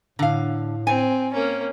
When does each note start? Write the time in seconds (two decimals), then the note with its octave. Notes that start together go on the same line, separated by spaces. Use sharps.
0.19 A2 D3 F5
0.87 C4 G#5
1.33 A#3 C#4